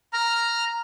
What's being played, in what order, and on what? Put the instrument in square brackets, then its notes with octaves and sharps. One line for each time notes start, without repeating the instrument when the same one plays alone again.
[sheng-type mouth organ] A#5 F6